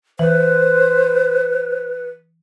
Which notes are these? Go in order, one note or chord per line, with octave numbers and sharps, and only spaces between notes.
E3 B4 C5